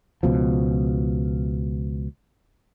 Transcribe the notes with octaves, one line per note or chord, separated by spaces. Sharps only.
C#2 B2 F3